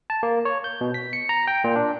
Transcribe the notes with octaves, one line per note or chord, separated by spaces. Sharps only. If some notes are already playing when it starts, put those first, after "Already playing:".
A5
A#3
C#5
G6
B2
B6
C#7
A#5
G5
A#2
D4